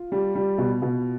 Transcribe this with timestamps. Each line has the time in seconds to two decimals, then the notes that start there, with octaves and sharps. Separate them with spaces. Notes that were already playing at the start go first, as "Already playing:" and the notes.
Already playing: F4
0.12 G3
0.35 G3
0.58 B2
0.82 B2